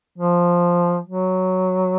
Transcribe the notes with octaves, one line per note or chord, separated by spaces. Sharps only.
F3
F#3